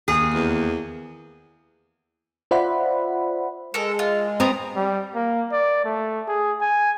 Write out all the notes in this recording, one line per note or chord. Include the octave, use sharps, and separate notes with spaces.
D#2 G#4
E2
F4 C5 D5 E5 F#5 B5
G#3 A4 A#4
F4
B3 C4 A#5 D#6
G3
A#3
D5
A3
G#4
G#5